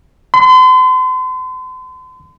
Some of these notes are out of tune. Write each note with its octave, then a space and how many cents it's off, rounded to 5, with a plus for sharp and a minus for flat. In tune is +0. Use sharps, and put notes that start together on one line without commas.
C6 -40